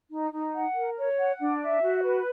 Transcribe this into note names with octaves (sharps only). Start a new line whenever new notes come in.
D#4
D#4
F#5
A#4
C#5
F#5
D4
E5
F#4
B4